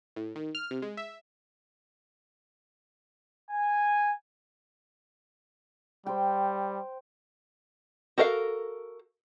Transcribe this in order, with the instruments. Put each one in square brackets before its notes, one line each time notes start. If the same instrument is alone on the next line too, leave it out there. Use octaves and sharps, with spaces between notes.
[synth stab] A2
D#3
F6
C3
G#3
E5
[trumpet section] G#5
[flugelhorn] G3 [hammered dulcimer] C5 G5
[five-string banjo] F#4 A4 A#4 E5 F5